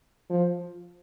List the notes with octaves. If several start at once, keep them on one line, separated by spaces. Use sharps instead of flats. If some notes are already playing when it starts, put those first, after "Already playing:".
F3